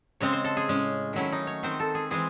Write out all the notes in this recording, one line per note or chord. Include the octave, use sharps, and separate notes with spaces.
C#3 G#3 C4 C#5
C5
A4
G#4
A2 G#3 C#4
D#3 F#3 A3 C#4 E4
D#4
C#5
D#3 G#3 C4 C5
A4
G#4
E3 G#3 C4 G#4